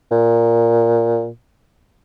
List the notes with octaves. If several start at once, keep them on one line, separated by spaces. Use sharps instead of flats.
A#2